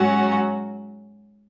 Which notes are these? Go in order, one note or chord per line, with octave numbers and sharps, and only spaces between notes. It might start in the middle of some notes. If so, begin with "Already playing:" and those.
Already playing: G#2 F#3 C#4 F#4